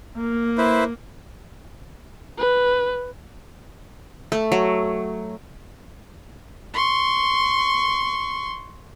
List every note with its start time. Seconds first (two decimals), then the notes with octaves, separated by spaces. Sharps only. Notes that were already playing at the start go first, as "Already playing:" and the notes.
0.17 A#3
0.58 E4 B4 C5
2.38 B4
4.32 A3
4.52 F#3
6.74 C6 C#6